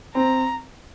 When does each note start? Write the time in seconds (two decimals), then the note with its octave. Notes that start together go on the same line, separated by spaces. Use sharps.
0.15 C4 A#5